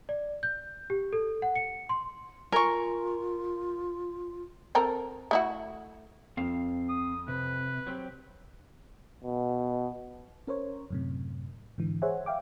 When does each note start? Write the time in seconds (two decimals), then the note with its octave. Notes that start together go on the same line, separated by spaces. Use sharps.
0.09 D5
0.43 G6
0.90 G4
1.13 A4
1.42 F#5
1.56 C#7
1.89 C6
2.52 F4 A#4 G#5 C#6
4.75 C4 A4 A#4
5.31 A3 E4 F#4
6.37 F2 C4 F5
6.89 D#6
7.28 C3 B4
7.87 F#3 C4 G4
9.24 B2
10.47 C#4 A#4 C5 C#5
10.91 F#2 A2 C3
11.78 G#2 D3 E3
12.02 G#4 C5 C#5 E5 F#5 G#5
12.26 E5 F5 G5 D6